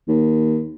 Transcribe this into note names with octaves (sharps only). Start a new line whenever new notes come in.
D#2